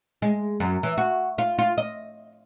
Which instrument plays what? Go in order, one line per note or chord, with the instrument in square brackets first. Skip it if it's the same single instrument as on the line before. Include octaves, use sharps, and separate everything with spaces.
[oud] G#3
F#2
E3
F#4
F4
F4
D#5